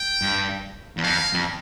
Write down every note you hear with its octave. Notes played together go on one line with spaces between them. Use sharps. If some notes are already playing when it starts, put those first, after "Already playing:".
Already playing: G5
G2
E2
F2 F5
F2